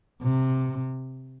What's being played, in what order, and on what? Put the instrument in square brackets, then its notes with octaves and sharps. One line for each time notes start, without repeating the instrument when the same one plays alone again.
[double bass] C3